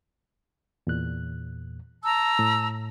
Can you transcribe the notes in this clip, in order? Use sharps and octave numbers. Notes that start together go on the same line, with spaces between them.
E2 A#2 F#6
A5 A#5 E6
A2